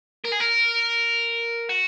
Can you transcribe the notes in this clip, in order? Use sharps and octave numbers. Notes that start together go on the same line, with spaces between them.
A#4
G#4
A#4
F#4